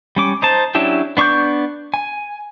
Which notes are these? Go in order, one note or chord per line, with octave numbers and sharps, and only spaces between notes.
G3 C#4 D6
D#4 C5 A5
F#3 C#4 D4 E4 G4
B3 D4 C#6 D6 G6
G#5